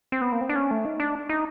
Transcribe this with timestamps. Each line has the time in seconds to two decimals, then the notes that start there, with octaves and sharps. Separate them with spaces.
0.12 C4
0.21 B3
0.32 A#3
0.41 C4
0.49 D4
0.56 C#4
0.71 A3
0.85 D#4
1.00 D4
1.29 D#4